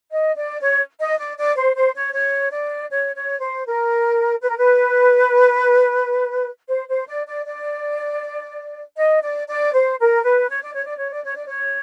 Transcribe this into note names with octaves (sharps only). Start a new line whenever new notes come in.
D#5
D5
C#5
D#5
D5
D5
C5
C5
C#5
C#5
D5
C#5
C#5
C5
A#4
B4
A#4
B4
C5
C5
D5
D5
D5
D#5
D5
D5
C5
A#4
B4
C#5
D5
C#5
D5
C#5
D5
C#5
D5
C#5